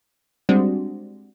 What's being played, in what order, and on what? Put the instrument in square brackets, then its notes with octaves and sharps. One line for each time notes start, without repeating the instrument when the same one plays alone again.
[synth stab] G3 G#3 C4 D4 F#4